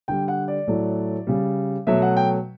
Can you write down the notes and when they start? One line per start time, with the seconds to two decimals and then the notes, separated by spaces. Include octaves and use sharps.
0.08 D3 G3 G5
0.28 F#5
0.48 D5
0.67 A2 F#3 A3
1.27 C#3 G3
1.87 B2 F#3 A3 E5
2.02 F#5
2.17 G5